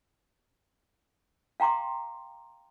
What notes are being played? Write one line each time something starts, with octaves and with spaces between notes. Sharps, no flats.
F5 G5 A#5 C6 D6